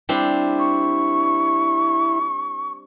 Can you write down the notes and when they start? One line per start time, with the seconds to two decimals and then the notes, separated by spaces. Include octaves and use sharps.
0.09 G3 C4 D4 E4
0.59 C#6